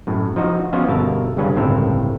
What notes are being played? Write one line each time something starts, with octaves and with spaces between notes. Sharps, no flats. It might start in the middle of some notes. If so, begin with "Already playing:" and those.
F#2 A2
F3 D#4 F#4
F3 B3 C#4 F4 F#4
G1 B2 A#4 E5 A5
G1 G2 C#3 C#4 B4 F5
G1 C#2 A2 C4 A#4 E5